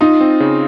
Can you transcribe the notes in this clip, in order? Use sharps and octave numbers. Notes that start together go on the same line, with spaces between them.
D#4 F4
C4
C#3